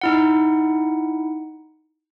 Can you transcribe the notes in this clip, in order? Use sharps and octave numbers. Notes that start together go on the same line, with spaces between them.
D#4 E4 F#5